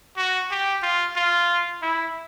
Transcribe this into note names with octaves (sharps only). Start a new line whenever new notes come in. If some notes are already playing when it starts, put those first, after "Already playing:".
F#4
G4
F4
F4
E4